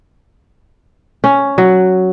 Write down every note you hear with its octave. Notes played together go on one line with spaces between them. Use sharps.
C#4
F#3